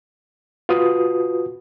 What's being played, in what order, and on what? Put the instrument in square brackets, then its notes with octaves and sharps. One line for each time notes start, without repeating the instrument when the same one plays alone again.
[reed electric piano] F4 F#4 B4 D#6